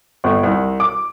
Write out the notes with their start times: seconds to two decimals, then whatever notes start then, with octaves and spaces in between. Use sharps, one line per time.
0.24 G1
0.43 C2
0.80 D6